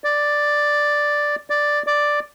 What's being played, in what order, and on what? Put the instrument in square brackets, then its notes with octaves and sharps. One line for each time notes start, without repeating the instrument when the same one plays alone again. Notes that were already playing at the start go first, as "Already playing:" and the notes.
[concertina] D5
D5
D5